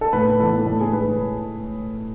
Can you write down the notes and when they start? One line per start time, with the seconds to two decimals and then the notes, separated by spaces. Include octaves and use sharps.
0.01 A4
0.13 A2 B4
0.40 E3 B3 A4
0.66 A2 A4
0.80 G#4
0.93 G#3 B4